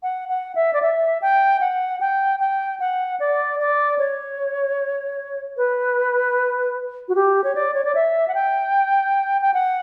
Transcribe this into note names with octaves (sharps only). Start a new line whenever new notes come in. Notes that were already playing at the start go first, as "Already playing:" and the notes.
F#5
F#5
E5
D5
E5
G5
F#5
G5
G5
F#5
D5
D5
C#5
B4
F#4
G4
C#5
D5
C#5
D5
E5
F#5
G5
G5
F#5